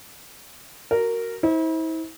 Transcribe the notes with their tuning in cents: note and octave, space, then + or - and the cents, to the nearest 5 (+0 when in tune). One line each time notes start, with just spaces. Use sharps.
F#4 +15 A#4 -10
E4 -40 C5 +10